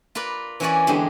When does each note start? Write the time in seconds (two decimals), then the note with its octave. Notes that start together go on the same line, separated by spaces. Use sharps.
0.15 F4 A#4 B4 D5
0.60 E3 C#4 F#4 A#4 C#5 D5
0.87 E2 G2 D3 G#3 G4 C5